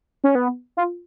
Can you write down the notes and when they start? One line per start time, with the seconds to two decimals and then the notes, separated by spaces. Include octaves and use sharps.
0.24 C#4
0.35 B3
0.77 F4